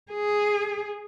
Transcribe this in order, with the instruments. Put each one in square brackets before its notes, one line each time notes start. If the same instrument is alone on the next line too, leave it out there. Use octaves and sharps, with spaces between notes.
[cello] G#4